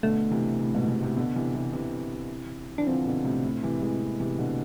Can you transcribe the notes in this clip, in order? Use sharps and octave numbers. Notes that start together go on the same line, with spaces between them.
B2 D3 A3
C3 E3
A2 C3
G#2 B2
G#2 B2
A2 C3
B2 D3 B3
C3 E3
C3 E3
C3 E3
E3 D4
D3 F3 C4
B2 D3
A2 C3
A2
C3 E3
E3 G#3
B3
C3 E3
B2 D3